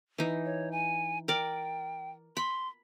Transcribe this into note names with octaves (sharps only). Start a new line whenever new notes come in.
E3 D#4
C#5
G#5
A#4 D5 G5
B5 C6